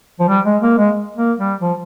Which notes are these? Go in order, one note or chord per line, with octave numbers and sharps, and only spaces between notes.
F3
G3
G#3
A#3
G#3
A#3
G3
F3